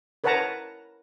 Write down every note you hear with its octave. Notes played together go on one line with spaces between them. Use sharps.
A#4 B4 C#5 F#5 A5 A#5